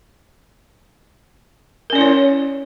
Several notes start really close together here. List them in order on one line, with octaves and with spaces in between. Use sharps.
A#4 C#4 D5 E4 C#5